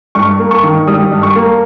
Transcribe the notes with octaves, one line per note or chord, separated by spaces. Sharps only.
G2 C#6
A#3
C#6
D#3
G3 D#6
G2
C#6
A#3